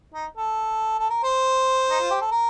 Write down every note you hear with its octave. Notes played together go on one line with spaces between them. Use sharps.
D#4
A4
A4
A#4
C5
D#4
F4
G4
A4
A#4